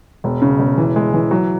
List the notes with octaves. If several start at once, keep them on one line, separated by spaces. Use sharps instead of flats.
E1
C#3
E1
E3
G#3
E3
F#3